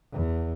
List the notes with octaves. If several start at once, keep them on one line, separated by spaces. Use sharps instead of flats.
E2